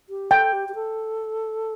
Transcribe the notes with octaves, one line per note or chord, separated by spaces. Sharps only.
G4
A4 G5
G4
G4
A4